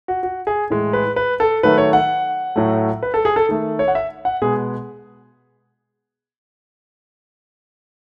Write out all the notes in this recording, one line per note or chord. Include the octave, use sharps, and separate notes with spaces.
F#4
F#4
G#4
A2 E3 G#3
B4
B4
A4
D#3 F#3 A3 B4
C#5
F#5
A2 F#3 A3
B4
A4
G#4
A4
D#3 A3
C#5
F#5
E5
F#5
B2 G#3 B3 G#4